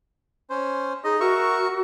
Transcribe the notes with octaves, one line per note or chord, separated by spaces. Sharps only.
C#4 C5
D#4 G#4 D#5
F#4 A#4 E5 C#6